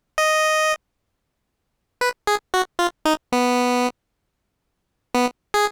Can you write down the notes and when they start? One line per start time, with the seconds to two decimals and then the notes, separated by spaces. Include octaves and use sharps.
0.18 D#5
2.01 B4
2.27 G#4
2.54 F#4
2.79 F4
3.05 D#4
3.32 B3
5.14 B3
5.54 G#4